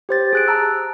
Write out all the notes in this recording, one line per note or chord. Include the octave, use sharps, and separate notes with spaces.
G4 C5 A6
G#4 F#6 D7
A5 A#5 E6